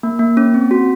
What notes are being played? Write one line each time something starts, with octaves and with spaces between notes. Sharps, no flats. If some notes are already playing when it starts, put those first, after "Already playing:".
A#3
A#3
C#4
C4
F#4